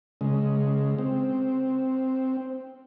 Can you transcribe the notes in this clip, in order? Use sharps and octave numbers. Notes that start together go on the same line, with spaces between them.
C#3 G#3
C4